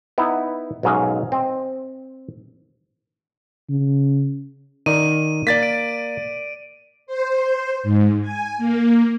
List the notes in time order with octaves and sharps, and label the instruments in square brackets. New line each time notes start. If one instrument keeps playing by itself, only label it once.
[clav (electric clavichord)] B3 D#4 E4
B1 G#2 F#3 C#4 D#5 F5
C4 D#5
[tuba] C#3
[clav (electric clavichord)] D#3 D5 [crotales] D#7
[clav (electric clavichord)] A#3 [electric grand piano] D5 A6 B6
[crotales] D7
[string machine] C5
G#2
G#5
A#3